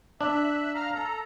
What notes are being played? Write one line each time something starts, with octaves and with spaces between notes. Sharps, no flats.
D4 E5 E6 F#6
F5 A#5 F6
A4 A#5